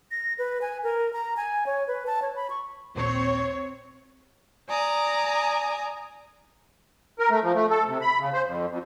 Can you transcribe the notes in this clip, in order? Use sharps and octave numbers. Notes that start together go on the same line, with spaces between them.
A#6
B4
G#5
A#4
A#5
G#5
C#5
B4
A5
C#5
B5
C#6
A#1 D#2 A#2 C4 C#5
D5 G#5 A#5 D#6
A#4
A3
F3
A3
A4
C3
B5
C#3
C5
F2
F2